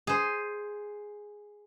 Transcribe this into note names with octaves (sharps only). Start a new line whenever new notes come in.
G#4 C5